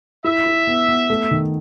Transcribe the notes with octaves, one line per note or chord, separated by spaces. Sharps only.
E4 E5
E4
B3
B3
A3
D#3